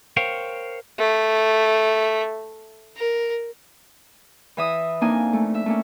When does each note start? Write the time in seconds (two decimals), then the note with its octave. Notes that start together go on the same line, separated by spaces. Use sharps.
0.17 A#4 C5 C#5 F5 G5
0.98 A3
2.97 A#4
4.57 E3 E5 D#6
5.01 F2 A#3 D4 D#4 G#5
5.33 A3
5.54 E5
5.66 A3 A#3 C#4